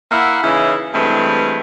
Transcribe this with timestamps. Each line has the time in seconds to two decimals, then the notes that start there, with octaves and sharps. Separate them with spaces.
0.12 A#3 E4 E5 F#5
0.43 C#3 E3 C#4 D#4 E4
0.93 G2 E3 G#3 A3 C4